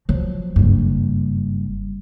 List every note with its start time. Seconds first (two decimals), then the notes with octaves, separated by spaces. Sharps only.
0.09 F3 F#3
0.56 F#1 G2